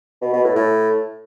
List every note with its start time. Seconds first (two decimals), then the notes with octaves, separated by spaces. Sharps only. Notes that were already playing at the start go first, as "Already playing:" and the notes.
0.22 B2
0.33 B2
0.44 A2
0.55 A2